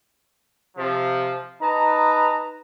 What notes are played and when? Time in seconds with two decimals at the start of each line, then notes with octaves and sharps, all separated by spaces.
0.77 C3 F3
1.62 D#4 B4 A5 A#5